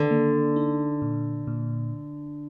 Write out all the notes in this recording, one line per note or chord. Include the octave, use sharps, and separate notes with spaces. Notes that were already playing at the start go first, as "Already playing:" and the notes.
Already playing: D3 D#3
A#3
D#4
A#2
A#2